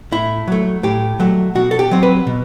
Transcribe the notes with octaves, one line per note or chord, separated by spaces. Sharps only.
A2 E4
F#3 A3
A2 G4
F#3 A3
B2 F#4
A4
G4
F#3 C4
B4
B2